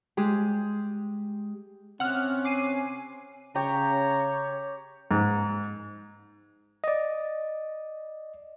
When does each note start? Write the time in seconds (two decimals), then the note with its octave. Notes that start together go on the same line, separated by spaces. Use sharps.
0.17 G#3 G4 G#4
2.00 C3 C4 C#4 F#5 F6 F#6
2.45 G#5 D6 C7 D#7
3.55 C#3 G4 C#5 A#5
5.11 G#2
6.84 D5 D#5